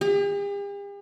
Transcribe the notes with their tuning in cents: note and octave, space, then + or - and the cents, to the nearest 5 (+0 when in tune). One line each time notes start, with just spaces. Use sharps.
G4 +45